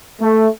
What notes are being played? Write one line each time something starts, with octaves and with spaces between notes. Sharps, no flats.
A3